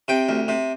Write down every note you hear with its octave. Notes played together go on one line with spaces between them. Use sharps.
C3 G5
D2
C3